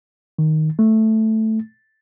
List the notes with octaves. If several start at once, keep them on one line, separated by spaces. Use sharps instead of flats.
D#3
A3